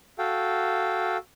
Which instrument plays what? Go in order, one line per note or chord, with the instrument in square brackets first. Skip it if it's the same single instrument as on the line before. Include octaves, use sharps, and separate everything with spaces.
[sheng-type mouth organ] F#4 A4 F5 G5